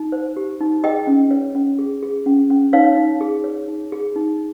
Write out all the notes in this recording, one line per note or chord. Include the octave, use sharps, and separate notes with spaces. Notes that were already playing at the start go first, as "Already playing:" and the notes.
Already playing: D#4
C5
G4
D#4
G#4 D#5 G5
C#4
C#5
C#4
G#4
G#4
C#4
C#4
D#4 C#5 F5
D#4
G#4
C#5
D#4
G#4
D#4